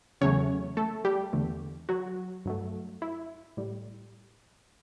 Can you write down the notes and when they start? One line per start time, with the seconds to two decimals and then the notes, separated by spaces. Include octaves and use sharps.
0.21 E2 C#3 F#3 A3 C#4 C#5
0.77 A3 A4
1.05 G3 G4
1.33 E2 D3 A3
1.89 F#3 F#4
2.45 G2 F#3 A3
3.02 E4
3.57 A2 G3